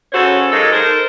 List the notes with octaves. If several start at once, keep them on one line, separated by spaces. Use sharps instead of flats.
C#3 C#4 F#4 A4 C5 C#5
F#3 G#3 A#3 D#4 A4
D#4 A4 A#4 C5